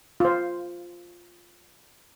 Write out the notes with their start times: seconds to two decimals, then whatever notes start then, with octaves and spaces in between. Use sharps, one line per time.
0.20 F4 C5